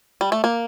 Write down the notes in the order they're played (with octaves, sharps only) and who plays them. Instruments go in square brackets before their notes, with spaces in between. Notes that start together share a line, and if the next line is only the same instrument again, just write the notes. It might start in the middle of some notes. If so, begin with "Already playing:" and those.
[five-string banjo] G3
A3
A#3